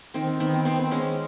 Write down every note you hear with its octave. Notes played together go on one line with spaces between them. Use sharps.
D#3 C4
D#3 B3
C4
B3 C4
C4
G#3 C#4